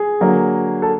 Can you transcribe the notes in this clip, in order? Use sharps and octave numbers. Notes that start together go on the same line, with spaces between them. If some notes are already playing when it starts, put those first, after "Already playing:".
Already playing: G#4
D3 F#3 A#3
A4